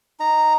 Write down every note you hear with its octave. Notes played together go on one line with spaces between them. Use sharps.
D#4 A#5